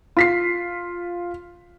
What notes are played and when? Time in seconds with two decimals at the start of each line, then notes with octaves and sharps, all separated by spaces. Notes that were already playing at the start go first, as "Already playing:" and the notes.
0.17 F4 B6 C7